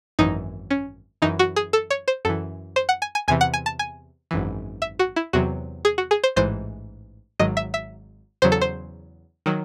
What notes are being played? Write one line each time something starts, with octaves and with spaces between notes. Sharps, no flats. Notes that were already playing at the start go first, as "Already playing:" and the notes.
G#1 F#2 E3 D#4
C#4
F#2 E3 D#4
F#4
G#4
A4
C#5
C5
F#2 E3 A4
C5
F#5
G#5
G#5
E2 C3 E3 G#5
F#5
G#5
A5
G#5
G#1 F#2 E3
E5
F#4
E4
E2 C3 F#3 F#4
G#4
F#4
G#4
C5
A1 G#2 E3 C5
G#1 G#2 D#3 F#3 D#5
E5
E5
E2 C#3 F#3 C5
A4
C5
D#3 F#3